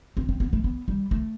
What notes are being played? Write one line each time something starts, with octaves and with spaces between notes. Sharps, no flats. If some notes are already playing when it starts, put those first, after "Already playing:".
C4
C4
B3
A3
B3
G3
A3